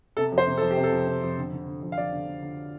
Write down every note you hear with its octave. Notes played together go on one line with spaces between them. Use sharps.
C3 A4
F2
C5
C3
F2 A4
G4
C3
A4
F2
C3
F2
D3
D3
D3
F2
F5
F2 D5
D3
D3
D3